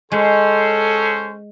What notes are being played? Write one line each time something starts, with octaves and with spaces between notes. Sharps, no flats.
G#3 C#4 A4 C5